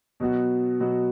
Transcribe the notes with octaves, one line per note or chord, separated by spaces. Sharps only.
B2 F#3 B3 F#4
B2 F#3 B3 F#4